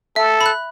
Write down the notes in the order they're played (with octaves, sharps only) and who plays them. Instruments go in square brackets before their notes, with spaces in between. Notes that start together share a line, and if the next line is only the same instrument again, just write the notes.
[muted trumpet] A4 [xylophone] E5
[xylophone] B5
F#6